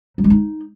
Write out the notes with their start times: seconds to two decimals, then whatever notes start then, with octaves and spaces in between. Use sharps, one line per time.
0.18 F#3
0.24 G#3
0.30 D#4